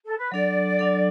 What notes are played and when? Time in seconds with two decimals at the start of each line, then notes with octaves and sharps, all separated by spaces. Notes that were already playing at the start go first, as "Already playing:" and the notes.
0.04 A4
0.18 B4
0.32 F#3 D4 A4 D5
0.79 F#3 D4 A4